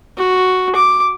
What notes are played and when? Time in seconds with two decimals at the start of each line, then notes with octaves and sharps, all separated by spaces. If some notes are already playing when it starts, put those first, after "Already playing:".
0.18 F#4
0.75 D6